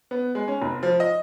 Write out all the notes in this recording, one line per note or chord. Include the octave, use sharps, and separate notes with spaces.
B3
G#3
C#4
F1
F3
D#5